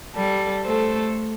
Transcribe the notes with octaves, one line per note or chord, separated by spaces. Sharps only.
G3 A4
A3 A4 C5